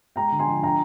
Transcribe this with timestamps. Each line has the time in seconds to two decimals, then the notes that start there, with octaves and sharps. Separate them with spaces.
0.16 G#3 G5 A#5
0.32 D3
0.39 G#5 C6
0.48 F3
0.62 D4 G5 A#5